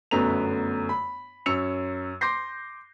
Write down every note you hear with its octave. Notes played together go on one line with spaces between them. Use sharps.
G1 F#2 A3 B3 A#5 F7
B5
F#2 C#5 E6 C#7 F7
C6 D6 G6 A#6 C7